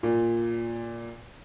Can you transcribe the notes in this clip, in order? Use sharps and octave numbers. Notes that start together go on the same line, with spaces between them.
A#2